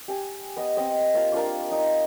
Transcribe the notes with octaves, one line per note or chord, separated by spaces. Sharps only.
G4 G#5
B3 D#5
C4 D#5
A#3 F4 F5 A5
A#3 D4 F4 D6
D#4